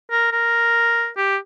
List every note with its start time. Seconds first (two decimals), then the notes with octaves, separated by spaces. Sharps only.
0.11 A#4
0.32 A#4
1.17 G4